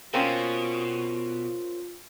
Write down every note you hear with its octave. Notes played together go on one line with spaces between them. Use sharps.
B2 A#3 C4 C#4 F4